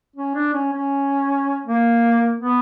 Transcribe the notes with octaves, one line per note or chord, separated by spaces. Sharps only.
C#4
D4
C#4
C#4
A#3
B3